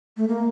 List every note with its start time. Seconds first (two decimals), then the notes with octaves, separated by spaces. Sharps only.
0.17 A3
0.28 A#3